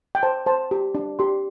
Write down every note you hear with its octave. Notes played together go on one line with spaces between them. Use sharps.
G5
C5 A5
C5 A5
G4
D4
G4 C6